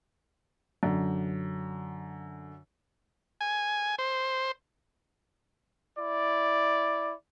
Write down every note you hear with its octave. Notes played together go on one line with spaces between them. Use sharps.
F#2 D3
G#5
C5
E4 D5